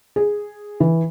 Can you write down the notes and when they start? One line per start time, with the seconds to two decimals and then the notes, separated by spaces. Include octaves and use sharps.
0.16 G#4
0.80 E3